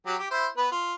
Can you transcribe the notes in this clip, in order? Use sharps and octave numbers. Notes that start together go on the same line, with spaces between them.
F#3 G4
G4
E4 C5
B3 B4
F4